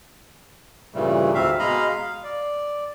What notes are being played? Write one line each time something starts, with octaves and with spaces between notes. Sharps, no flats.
G2 A#2 C#3 E3 G3 A3
D2 G#2 C4 E5 F5
B2 G#3 D#5 F5 A#5 B5
F5
D5